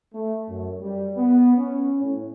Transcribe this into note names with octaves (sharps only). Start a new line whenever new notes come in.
A3
F#2
G3
B3
C#4
A2